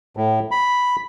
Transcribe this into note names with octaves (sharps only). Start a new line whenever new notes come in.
A2
B5